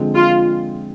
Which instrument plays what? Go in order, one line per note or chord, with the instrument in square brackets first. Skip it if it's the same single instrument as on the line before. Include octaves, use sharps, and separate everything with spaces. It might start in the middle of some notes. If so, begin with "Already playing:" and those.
Already playing: [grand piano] D3 F3 G#3 C4
[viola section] F4